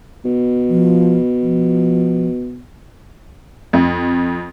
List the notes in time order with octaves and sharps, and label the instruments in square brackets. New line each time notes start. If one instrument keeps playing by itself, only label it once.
[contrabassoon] B2
[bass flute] F3
F3
[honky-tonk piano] F2